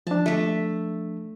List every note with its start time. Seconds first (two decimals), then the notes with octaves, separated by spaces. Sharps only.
0.07 F3 D4 A5
0.26 A3 E5